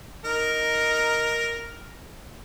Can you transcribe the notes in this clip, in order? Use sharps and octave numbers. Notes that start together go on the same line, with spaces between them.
D#4 A#4